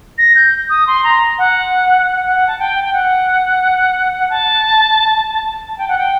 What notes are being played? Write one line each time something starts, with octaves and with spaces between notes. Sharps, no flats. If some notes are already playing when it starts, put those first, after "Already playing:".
A#6
G6
D#6
C6
A#5
F#5
F#5
A5
G5
G5
F#5
A5
A5
G5
F#5
G5